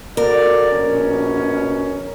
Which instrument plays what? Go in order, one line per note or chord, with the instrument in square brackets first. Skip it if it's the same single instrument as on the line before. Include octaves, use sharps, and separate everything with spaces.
[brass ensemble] F#4 A4 D5 [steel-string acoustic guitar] A#4
[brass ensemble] A#1 B2 C#4